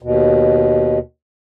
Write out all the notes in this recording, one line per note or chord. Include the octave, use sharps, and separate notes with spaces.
D#2 B2